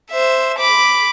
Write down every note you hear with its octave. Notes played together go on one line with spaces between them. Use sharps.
C5 E5
B5 D6